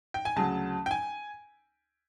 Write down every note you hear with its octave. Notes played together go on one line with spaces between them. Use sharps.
G5
G#5
D2 C#3 F#3 A5
G5
G#5